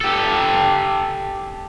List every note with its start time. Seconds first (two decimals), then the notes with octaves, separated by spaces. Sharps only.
0.01 G4 A4